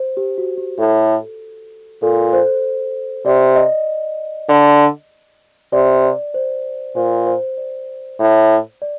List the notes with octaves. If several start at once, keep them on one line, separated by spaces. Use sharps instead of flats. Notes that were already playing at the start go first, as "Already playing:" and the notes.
Already playing: C5
G4
F#4
G4
A2 A4
A#2 A4
C5
C3 D5
D#5
D3
C3 D5
D5
C5
A#2 C5
C5
D5
A2
D5